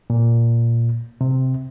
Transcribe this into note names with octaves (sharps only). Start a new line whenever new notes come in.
A#2
C3